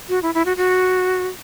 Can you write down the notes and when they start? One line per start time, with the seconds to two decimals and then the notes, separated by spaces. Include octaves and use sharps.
0.09 F#4
0.23 E4
0.34 E4
0.46 F#4
0.57 F#4